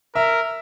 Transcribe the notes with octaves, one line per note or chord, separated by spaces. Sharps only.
A#4 E5